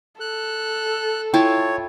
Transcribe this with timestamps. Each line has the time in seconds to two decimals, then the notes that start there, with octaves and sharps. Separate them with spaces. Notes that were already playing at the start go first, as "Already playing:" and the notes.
0.20 A4 F#6
1.34 E4 F4 C#5 G5 A5